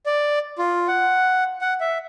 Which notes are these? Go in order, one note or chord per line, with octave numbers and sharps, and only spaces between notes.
D5
F4
F#5
F#5
E5